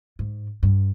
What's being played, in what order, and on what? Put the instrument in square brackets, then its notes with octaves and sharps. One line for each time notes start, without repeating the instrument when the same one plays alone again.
[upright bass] G#2
G2